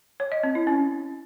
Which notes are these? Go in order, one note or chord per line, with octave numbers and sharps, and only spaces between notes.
C#5
D#5
C4
E4
C#4